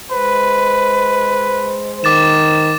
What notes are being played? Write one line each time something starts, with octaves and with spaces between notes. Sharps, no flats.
G#3 B4 C5
D#3 D6 A6 E7